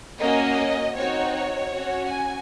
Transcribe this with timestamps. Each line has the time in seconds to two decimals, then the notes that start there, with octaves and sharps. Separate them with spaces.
0.20 A#3 C#4 F#4 D#5
0.96 C4 D#4 F#4 C#5
1.35 C#5
1.73 C#4 F#4
2.11 G#5